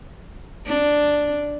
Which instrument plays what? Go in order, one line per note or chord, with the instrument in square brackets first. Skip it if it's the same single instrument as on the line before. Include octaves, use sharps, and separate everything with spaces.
[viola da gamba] D4